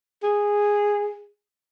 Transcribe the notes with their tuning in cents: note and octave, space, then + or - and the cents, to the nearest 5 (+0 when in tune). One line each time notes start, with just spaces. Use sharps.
G#4 -10